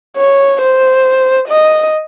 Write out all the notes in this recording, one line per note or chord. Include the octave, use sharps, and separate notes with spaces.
C#5
C5
D#5